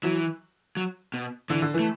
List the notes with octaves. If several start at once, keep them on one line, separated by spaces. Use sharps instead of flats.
E3 F#3
F#3
B2
D3 E3
D3
E3
A3